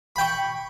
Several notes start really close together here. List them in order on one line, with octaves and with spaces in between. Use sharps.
B5 G5 C#6